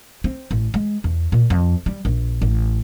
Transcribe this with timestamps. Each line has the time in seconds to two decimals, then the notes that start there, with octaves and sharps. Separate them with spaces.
0.24 C4
0.51 A1
0.74 G#3
1.04 E2
1.32 A#2
1.50 F2
1.86 G3
2.05 A#1
2.42 A1